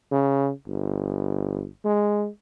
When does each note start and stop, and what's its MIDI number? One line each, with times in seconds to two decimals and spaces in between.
0.12 0.51 49
0.67 1.68 31
1.85 2.29 56